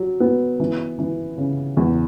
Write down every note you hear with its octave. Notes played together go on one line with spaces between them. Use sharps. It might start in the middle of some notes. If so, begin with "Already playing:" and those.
Already playing: F#3
B3
E3
E3
C#3
E2